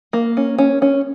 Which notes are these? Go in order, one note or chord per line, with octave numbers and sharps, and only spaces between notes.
A#3
C#4
C#4
C#4